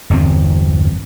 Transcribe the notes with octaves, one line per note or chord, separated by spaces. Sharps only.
G1 E2 C3 C4